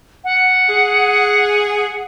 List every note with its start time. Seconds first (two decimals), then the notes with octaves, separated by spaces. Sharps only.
0.24 F#5
0.68 G#4